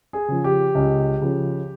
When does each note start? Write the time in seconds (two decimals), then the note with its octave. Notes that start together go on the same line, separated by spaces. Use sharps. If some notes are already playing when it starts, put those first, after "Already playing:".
0.13 G#4
0.28 C#3 F3
0.44 G4
0.75 C#2
1.21 C#3 F3